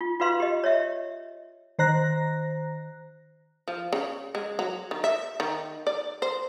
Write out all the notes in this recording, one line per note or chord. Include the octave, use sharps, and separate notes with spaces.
F4
F4 F#4 B4 F5 C6
G4 D#5
C#5 D#5 E5
D#3 C5 A#5 F#6 A#6
F3
C#3
G#3
F#3
D#3
E5
D#3
D5
C5